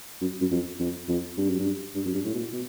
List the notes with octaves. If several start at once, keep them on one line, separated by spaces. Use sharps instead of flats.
F#2
F#2
F2
F2
F2
G2
F#2
G2
G2
F#2
G2
A2
B2
A#2
B2